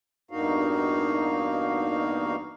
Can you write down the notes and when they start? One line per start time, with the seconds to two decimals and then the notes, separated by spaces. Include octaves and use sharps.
0.31 E2 G2 A#3 D#4 F#4 F5